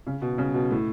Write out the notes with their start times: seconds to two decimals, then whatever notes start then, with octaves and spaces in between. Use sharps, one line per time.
0.07 C#3
0.22 B2
0.38 C#3
0.54 B2
0.71 A2